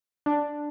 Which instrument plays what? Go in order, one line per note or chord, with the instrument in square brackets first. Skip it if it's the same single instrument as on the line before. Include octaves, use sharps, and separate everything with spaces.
[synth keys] D4